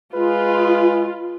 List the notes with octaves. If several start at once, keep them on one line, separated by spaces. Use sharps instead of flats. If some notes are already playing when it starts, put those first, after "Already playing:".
G#3 F4 G#4 B4